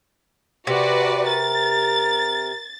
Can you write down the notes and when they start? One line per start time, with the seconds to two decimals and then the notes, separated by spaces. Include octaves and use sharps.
0.67 C3 F#4 B4 D5
1.27 A#4 A6